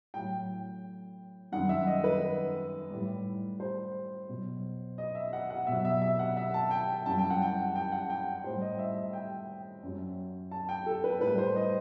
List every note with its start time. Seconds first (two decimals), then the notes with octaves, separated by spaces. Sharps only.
0.14 A2 F#3 G5
1.52 F#2 D#3 G3 F#5
1.69 E5
1.87 D#5
2.04 B4
2.90 A2 G3
3.60 C5
4.29 B2 F#3
4.98 D#5
5.15 E5
5.33 F#5
5.50 F#5
5.67 B2 F#3 E5
5.85 E5
6.02 E5
6.19 F#5
6.37 E5
6.54 A5
6.71 G5
7.06 F#2 E3 G3 A5
7.18 G5
7.30 F#5
7.42 G5
7.75 G5
7.92 F#5
8.10 G5
8.44 A2 G3 C5
8.62 D#5
8.79 E5
8.96 E5
9.13 G5
9.83 F#2 F#3
10.51 A5
10.69 G5
10.86 A4
11.04 B4
11.20 A2 G3 B4
11.38 C5
11.56 D#5